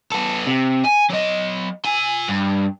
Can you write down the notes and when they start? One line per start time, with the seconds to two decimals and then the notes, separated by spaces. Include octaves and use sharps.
0.12 B3 A4
0.47 C3
0.84 G#5
1.10 F#3 D#5
1.85 F4 G#5
2.28 G2